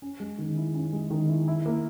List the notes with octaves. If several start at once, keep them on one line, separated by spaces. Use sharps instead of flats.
C#4
G#3
D#3
E4
C#4
G#3
D#3
E4
E4
A#3